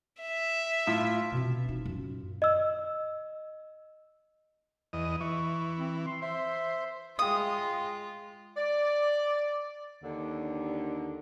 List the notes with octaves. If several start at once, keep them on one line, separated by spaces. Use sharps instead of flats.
E5
A2 F4
B2 C4
D4 D#4
F#2 A#2
D#5 E6
E2 D#5
E3 C#6
C4
C6
C5 E5
G#3 F4 F5 G5 D#6
D5
D#2 D3